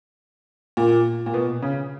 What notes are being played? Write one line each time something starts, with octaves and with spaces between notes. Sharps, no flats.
A#2
A#2
B2
C#3